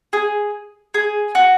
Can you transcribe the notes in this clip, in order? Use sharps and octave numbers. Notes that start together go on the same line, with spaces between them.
G#4
G#4
F#4